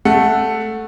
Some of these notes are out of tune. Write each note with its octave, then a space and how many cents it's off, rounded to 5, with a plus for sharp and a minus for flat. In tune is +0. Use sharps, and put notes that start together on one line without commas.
A3 +0 F#5 -5